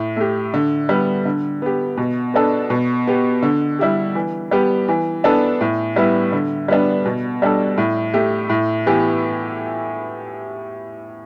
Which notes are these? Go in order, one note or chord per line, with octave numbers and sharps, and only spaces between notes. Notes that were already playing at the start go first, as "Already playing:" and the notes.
Already playing: A2
A3 G4
D3
G3 B3
D3
B3 G4
B2
B3 D4 A4
B2
B3 G4
D3
G3 E4 G4
E3
G3 B3 G4
E3
B3 D4 A4
A2
G3 B3 E4
D3
G3 B3 D4
B2
G3 D4 A4
A2
A3 G4
A2
E3 B3 E4 G4